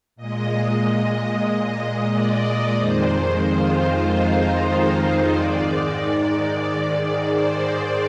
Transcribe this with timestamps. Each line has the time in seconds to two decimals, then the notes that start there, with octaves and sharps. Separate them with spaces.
0.16 A#2 G#3 D#5
2.11 D5
2.76 F2 D#3 G#3 C5
3.41 F4
4.06 D#4
5.35 G#2 D#3 G#3 D5
5.68 D5
7.30 C5